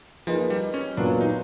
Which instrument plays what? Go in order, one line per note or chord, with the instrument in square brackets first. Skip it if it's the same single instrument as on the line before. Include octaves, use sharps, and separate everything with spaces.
[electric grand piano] F3 [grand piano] A#3 D#4 G#4 B4
[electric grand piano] G3
C#4
[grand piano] A#2 F#3 B3 [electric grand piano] D4
[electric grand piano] D#4